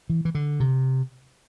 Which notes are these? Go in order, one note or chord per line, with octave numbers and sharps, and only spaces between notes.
E3
E3
D3
C3